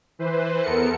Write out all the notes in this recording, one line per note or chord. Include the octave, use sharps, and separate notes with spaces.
E3 B4 C5
E2 B3 A4 A#4 C#7